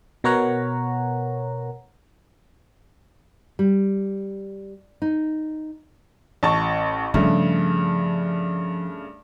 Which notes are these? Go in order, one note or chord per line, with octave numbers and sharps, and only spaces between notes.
B2 B3 A#4 C#5 F#5 A#5
G3
D#4
A1 A5 C#6
G2 C#3 F3 A3